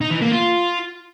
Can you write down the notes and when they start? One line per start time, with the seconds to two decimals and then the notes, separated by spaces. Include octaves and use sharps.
0.01 D#4
0.11 E3
0.22 A#3
0.32 F4